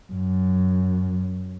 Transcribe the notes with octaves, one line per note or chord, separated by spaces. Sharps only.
F#2